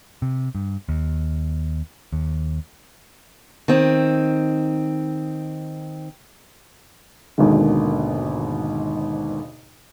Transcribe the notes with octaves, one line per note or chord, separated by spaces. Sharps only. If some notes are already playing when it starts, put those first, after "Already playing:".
C3
G2
D#2
D#2
D#3 C4
G#1 D#2 G#2 B2 D3 D#3